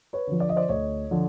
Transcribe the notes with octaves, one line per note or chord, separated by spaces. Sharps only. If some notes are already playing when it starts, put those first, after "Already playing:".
B4 C#5
D3 F3
D5
D#5
C5 D5
D2 C#5 D#5
D3 F3